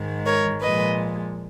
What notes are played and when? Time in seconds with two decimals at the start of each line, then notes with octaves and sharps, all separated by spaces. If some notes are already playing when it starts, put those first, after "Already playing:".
Already playing: G#2 D#3 G#3
0.26 A#4 C#5
0.61 A#2 F3 G#3 B4 D#5